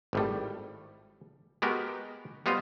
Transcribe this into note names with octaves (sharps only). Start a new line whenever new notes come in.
G#1 A2 G3
G#3 B3 F#4 G4 A#4
G3 B3 F4 C5 D#5 F5